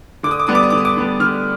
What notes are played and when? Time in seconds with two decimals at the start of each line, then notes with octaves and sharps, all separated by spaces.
0.23 D3 D6
0.31 D#6
0.40 D6
0.47 G3 B3 D4 D#6
0.55 D6
0.63 D#6
0.70 D3 D6
0.78 D#6
0.85 D6
0.96 G3 B3 D4
1.20 D3 F6